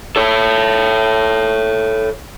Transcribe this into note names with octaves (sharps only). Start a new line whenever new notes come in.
A4 C#5